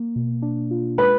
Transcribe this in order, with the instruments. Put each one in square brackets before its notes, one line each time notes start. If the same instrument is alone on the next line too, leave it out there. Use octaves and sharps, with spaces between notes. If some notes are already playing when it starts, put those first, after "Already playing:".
Already playing: [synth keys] A#3
B2
D4
F4
[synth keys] G#3 [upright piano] B4